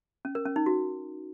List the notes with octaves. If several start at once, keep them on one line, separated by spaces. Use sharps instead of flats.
C#4
A#4
C#4
D#4
F#4